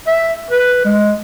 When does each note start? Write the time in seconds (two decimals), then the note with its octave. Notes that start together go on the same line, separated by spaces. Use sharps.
0.07 E5
0.50 B4
0.85 G#3